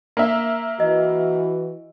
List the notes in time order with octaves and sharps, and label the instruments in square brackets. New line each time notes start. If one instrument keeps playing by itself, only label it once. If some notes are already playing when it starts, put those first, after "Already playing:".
[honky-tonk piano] A#3 E5
[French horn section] E3 F#4 [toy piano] D#5